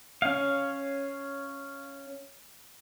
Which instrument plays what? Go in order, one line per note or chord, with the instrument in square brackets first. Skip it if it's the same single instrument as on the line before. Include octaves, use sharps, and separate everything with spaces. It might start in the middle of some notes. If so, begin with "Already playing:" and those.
[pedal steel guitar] C#4 F5